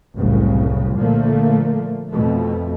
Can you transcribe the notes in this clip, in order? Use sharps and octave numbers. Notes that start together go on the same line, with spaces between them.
F#1 C2 A2 C#3
A#2 D3 F3 A3 A#3
F2 B2 A3